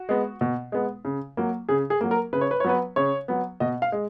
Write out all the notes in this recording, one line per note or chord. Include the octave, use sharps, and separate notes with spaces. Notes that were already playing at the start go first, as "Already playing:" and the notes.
Already playing: F#4
G#3 B3
B2
G#3 B3
C#3
F#3 A#3
C#3 G#4
G#4
F#3 A#3
A#4
C#3 B4
C#5
B4
C#5
F#3 B3 B4
C#3 C#5
F#3 B3
B2 D#5
F5
G#3